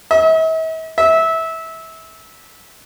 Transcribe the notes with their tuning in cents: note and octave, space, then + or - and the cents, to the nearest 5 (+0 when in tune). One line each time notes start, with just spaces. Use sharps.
E5 -45
E5 -20